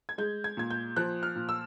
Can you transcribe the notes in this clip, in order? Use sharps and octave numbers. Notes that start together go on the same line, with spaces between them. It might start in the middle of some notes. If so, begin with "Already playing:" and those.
G#6
G#3 G6
G#6
A#2 G#6
G6
F3 F#6
F6
A#2
E6